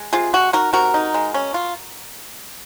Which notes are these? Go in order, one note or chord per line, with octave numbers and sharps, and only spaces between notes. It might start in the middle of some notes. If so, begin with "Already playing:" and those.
Already playing: G#3
C3 F4 G#4
G#3 F#4
D#4 F#4 A#4
C3 F#4 A#4
D#4
G#3
C#4
F4